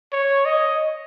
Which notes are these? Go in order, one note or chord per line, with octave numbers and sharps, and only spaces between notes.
C#5
D#5